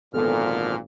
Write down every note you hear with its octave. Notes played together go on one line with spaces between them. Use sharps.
G#1 A#2 D3 F3 B3 A4 F6